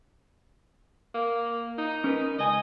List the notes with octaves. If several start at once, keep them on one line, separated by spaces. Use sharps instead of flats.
A#3
D#4
C#4 A#4 B4
C#2 D#5 G#5